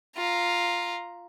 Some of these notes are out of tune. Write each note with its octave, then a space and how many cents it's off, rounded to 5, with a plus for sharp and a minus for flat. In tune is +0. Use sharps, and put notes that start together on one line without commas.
F4 +0 A#5 +0